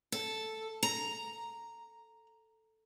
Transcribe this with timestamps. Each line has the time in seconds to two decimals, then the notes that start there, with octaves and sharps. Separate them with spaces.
0.12 A4
0.83 A#5